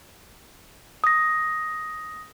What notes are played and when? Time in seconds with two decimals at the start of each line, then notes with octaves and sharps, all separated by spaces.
1.04 D#6 A#6